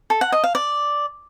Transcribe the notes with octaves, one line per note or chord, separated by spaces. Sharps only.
A4
F#5
D#5
F5
D5